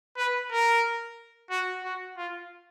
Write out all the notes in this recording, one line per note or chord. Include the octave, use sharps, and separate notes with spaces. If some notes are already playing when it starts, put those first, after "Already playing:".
B4
A#4
F#4
F#4
F4